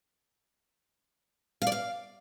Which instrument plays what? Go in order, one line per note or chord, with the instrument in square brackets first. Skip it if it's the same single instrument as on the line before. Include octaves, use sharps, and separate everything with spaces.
[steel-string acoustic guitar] F5
D5
F5